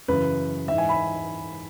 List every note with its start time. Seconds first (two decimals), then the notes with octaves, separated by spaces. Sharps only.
0.08 F#2 C#3 E3 B4
0.68 G#2 E3 E5
0.78 G#5
0.89 B5